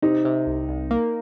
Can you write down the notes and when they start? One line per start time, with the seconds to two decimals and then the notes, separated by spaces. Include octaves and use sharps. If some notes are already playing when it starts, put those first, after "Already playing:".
0.02 C3 D#4
0.25 C3
0.47 C2
0.69 C2
0.91 A#3